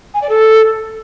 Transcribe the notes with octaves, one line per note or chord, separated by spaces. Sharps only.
G#5
D5
A4